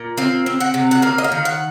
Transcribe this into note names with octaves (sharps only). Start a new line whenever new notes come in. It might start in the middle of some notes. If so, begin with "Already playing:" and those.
Already playing: A#2
C4 F5
C4
F#5
C3
F#5
A#3 F5
D#5
F5
D#3
F#5